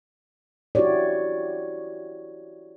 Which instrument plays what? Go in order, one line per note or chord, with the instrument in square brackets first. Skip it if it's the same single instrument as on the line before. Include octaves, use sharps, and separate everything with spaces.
[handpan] E4 F#4 G4 C#5 D5